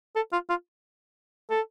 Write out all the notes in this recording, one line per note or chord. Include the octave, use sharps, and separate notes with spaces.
A4
F4
F4
A4